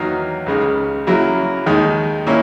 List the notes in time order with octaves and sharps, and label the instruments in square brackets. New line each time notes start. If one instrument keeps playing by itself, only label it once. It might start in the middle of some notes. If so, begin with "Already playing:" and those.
Already playing: [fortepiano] E2 D#3 F#3 A#3 D#4
C#2 C#3 G#3 D#4
C#3 F#3 A#3 E4
D#2 D#3 G#3 D#4
A#2 A#3 C#4 E4